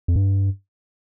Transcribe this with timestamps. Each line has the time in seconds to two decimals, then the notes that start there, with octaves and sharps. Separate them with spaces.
0.08 F2
0.16 G2